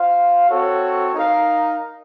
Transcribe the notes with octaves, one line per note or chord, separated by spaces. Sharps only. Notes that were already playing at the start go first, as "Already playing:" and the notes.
Already playing: F4 C5 F5
C4 F#4 A4 C#5
D#4 A#4 F5